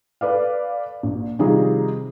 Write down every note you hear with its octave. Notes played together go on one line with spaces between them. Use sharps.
A4 B4 D5 F5
A#1
C3 D#3 F3 G3 D#4 G#4